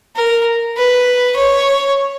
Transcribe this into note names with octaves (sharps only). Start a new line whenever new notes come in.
A#4
B4
C#5